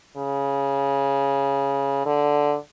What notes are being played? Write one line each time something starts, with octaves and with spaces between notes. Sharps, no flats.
C#3
D3